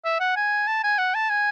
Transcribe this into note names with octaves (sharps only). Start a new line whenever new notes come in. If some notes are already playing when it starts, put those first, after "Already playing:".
E5
F#5
G#5
A5
G#5
F#5
A5
G#5